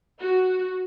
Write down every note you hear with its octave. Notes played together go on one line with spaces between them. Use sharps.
F#4